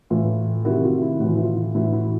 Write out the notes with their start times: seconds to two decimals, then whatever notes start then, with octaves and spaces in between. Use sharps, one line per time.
0.10 A2 E3 F4
0.65 C3 D#3 E4 F#4
0.84 F4
1.02 E4
1.20 A2 F#4
1.24 E3 F4
1.36 E4
1.43 F4
1.75 A2 E3 E4 F#4
1.93 E4 F#4